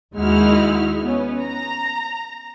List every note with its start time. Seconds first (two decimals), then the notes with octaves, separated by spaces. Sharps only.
0.15 D#2 G#3 D#4 E4 F#4 F6
1.02 B3 C#4
1.41 A#5